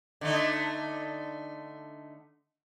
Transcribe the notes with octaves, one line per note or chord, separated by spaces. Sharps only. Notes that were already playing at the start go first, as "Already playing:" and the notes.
D3 A3 D#4